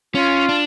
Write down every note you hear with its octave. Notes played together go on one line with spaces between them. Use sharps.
C#4 F4
D4